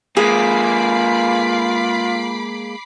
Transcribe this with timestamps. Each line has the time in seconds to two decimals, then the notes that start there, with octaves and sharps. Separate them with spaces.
0.17 G#3 A#3 F4 G#4 B5 D6 C7